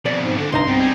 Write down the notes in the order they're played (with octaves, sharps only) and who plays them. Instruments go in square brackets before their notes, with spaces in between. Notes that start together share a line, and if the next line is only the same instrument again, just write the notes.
[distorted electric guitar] F2 B2 [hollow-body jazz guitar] D5
[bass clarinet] G#2
[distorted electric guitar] E2 D4 [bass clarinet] D3
[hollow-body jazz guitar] C2 D#4 A#5 [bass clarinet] G2 [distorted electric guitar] C6
[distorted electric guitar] B2 [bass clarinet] C4
[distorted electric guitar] G3 G#4